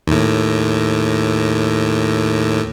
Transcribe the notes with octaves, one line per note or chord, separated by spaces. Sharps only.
D#2 A2